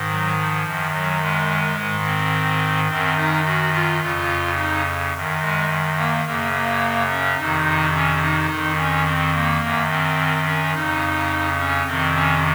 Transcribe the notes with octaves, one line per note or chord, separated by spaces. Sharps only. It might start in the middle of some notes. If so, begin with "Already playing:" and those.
Already playing: G#2 D#3
F#3
F3
F#2 D#3
F#3
G#3
G#2 D#3
C4
F#2 D#3 C4
D#4
F#4
F4
F2 C#3 F4
D#4
F#2 D#3
G#3
A#3
F#2 C#3 A#3
A#3
C#4
F2 C3 D#3 D#4
C#4
D#4
F2 D#3
C#4
C4
A#3
F#2 D#3
C4
C#4
F2 C#3 D#4
C#4
F2 C3 D#3 C4
C#4